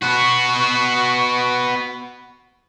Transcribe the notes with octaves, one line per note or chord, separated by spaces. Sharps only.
B3 F#4